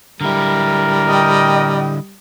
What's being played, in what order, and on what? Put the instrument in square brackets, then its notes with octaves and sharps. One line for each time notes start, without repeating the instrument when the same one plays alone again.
[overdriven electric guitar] D3 E4 [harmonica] G3 [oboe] A#4
[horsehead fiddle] D#5 G5